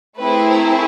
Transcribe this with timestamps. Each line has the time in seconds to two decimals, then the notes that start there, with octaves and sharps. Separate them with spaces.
0.19 A3 C4 E4 G#4 B4
0.50 A#4